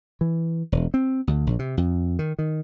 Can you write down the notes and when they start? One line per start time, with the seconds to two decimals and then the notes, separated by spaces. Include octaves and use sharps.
0.21 E3
0.72 E1
0.94 C4
1.27 D2
1.47 A#1
1.59 C3
1.77 F2
2.19 D#3
2.39 D#3